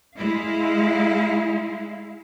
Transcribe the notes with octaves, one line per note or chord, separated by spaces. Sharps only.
G#3 E4 F5